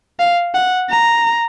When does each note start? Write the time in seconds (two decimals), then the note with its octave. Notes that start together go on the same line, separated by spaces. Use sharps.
0.20 F5
0.55 F#5
0.90 A#5